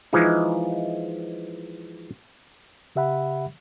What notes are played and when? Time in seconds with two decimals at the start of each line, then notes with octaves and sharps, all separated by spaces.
0.13 E3 F3 G#3 D#4
2.96 C#3 G4 E5 F#5 B5